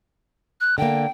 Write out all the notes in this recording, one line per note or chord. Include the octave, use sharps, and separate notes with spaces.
F#6
D3 A#3 G5